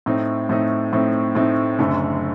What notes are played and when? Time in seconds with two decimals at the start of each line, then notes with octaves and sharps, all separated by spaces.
0.06 A2 A3 C4 D#4
0.49 A2 A3 C4 D#4
0.93 A2 A3 C4 D#4
1.35 A2 A3 C4 D#4
1.79 F#1 F#2 D3 A3